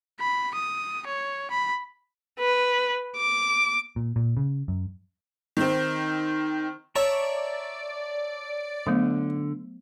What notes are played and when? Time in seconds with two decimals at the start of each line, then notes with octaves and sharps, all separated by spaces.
0.20 B5
0.54 D#6
1.07 C#5
1.50 B5
2.39 B4
3.16 D6
3.96 A#2
4.16 A#2
4.37 C#3
4.68 F#2
5.57 D#3 C4
6.96 C#5 D5 E5 A5 A#5 C#6
8.87 D3 F#3 A3 B3